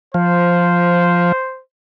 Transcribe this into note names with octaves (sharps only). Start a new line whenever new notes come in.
F3 C5